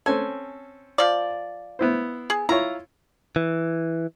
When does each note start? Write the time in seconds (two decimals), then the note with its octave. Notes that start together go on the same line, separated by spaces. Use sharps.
0.06 C4 C#4 A4 G#5
0.98 F3 D5
1.79 B3 E4 C5
2.30 G#4
2.49 E4 F4 C#5 A#5
3.36 E3